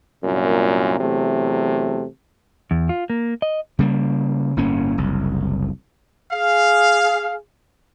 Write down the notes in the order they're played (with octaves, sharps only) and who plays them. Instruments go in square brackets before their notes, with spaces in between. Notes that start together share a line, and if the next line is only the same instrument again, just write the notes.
[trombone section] C2 F#2 A#2
E2 C3 F#3 A3
[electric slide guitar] E2
F4
A#3
D#5
[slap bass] C#3 G3 A#3
G1 A2 A#3 C#4
F#1 C2
[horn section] G#4 F5